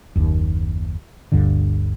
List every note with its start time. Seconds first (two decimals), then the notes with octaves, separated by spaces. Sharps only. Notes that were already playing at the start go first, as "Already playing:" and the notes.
0.16 F#1 D#2
1.32 G1 D2 G2 D3